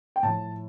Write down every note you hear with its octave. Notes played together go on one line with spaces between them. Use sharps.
G5
A2 F3 A5